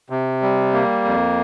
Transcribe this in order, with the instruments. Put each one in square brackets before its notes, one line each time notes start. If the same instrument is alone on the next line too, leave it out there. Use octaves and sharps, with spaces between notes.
[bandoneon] C3
G3
A#3
F2